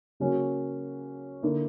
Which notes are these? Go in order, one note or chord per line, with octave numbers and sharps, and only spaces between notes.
C#3 F#3 A#3 C#4 F#4
D3 A#3 E4